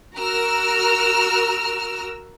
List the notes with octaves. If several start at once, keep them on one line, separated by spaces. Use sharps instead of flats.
F#4 A#4 A#5 E6 F6